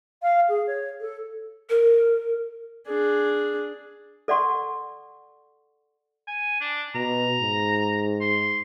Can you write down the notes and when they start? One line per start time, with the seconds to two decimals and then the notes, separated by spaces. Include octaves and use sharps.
0.22 F5
0.48 G#4
0.67 C#5
1.00 A4
1.70 A#4
2.87 D4 G#4
4.28 A4 D5 F#5 C6 C#6
6.27 G#5
6.61 D4
6.95 B2 A#5
7.41 G#2
8.21 C6